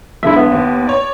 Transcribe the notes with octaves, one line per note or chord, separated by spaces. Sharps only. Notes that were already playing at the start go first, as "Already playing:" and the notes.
B1 D3 G#3 E4 E5
B3
D#2
C#5 D5